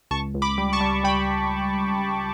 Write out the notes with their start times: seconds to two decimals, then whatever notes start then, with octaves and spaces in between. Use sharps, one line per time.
0.11 C#2 A5 C#6
0.34 C#2
0.42 B5 D6
0.58 G3
0.73 A5 C#6
0.81 G3
1.04 G3 G5 B5